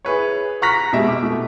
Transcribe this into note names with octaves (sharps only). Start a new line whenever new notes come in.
E4 G#4 B4 C#5
A#5 C#6 F6 F#6 A#6 B6
B2 G#3 G4 E5
D6
B2 A3